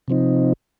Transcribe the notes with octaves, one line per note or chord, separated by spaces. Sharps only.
C3 F3 C4 D#4